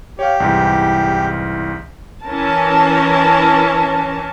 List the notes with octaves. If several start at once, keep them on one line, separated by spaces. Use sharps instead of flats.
G4 C#5 F5
C2 G#2 E3
E3 C#4 A#4 A5